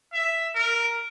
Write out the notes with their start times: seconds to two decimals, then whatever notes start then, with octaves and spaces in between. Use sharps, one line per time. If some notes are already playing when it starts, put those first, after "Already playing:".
0.13 E5
0.55 A#4